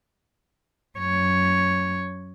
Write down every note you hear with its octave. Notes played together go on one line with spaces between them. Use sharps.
F#2 C#5